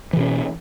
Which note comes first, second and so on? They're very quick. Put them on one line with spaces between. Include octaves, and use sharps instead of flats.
E3 B2 C#4